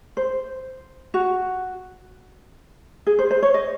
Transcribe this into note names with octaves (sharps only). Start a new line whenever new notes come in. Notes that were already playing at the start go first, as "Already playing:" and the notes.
C5
F#4
G#4
C5
C5
C#5
D#5